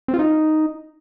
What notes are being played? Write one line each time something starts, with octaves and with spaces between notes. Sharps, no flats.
C4
F4
D#4